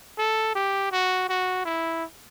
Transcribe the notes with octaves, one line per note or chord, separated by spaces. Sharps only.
A4
G4
F#4
F#4
E4